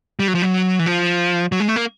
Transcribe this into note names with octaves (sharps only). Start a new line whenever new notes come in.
G3
F#3
F3
F#3
E3
F3
F#3
G#3
A3
A#3